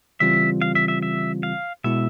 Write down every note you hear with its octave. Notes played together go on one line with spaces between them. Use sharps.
C#3 E3 G3 C4 F4 E5
F5
E5
E5
E5
F5
B2 G#3 B3 E4 E5